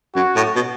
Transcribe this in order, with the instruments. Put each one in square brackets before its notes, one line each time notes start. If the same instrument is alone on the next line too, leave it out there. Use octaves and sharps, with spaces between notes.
[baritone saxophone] F#2 [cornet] F#4
[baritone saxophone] A2
B2